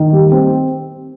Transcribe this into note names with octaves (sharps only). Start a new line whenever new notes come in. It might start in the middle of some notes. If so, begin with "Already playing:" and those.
Already playing: D#3
G3
C4